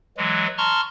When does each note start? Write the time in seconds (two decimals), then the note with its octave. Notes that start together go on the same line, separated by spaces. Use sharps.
0.17 E3 F#3 G#3
0.58 A5 A#5 C6 C#6 F6